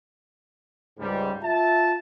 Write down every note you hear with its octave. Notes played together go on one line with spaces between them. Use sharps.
C#2 G#2 G3
F4 E5 A5